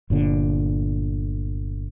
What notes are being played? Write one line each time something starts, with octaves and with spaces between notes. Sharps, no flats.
G1 A#2 D3